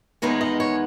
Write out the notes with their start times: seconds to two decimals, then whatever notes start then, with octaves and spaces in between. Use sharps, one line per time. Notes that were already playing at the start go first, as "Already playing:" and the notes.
0.22 E2 D#3 G#3 B3 D#4 C#5
0.41 D#5
0.60 C#5